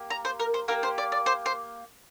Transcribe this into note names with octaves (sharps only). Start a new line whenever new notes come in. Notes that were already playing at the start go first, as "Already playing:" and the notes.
Already playing: A#3 G4
A#5
C5
A#4
C5
A#3 G4 A#4
C5
D5
D5
C5
C5